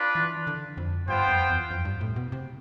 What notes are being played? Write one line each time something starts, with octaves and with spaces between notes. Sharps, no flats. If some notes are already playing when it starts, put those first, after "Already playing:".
Already playing: D4 F4 B4
E3
D3
F2
G2 B3 F4 C5 G5
F2
E2
F2
G2
A2
B2
C3